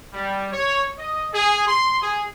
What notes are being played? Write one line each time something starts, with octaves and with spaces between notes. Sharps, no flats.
G3
C#5
D#5
G#4
C6
G#4